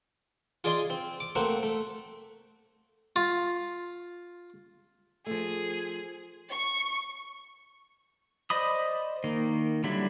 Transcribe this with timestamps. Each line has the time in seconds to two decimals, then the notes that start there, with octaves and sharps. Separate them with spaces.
0.64 F4 G#4 D5 D#5 G#5 C6
0.90 C4
1.20 D6
1.35 A3 A#3 C4 F#4 C5
1.63 A3
3.16 F4
5.26 F3 A3 G#4
6.52 C#6
8.50 C5 D5 D#5 B5 D#6
9.24 D#3 A#3
9.84 D3 F#3 G3 E4